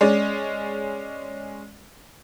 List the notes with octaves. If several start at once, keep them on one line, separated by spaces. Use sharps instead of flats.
G#3 C#4 D5